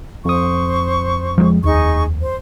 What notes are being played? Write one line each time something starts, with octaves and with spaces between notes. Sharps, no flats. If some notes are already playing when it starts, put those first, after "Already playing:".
F2 C5 C#6 D#6
F3 F#3 G#3
D#2 D#4 G#4 C#6
C5